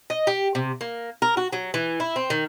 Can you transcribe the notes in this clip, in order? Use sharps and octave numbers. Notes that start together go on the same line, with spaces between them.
D#5
G4
C3
A#3
A#4
F#4
F#3
E3
E4
C4
D#3